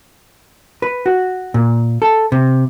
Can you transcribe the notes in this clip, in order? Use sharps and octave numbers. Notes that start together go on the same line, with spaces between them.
B4
F#4
A#2
A4
C3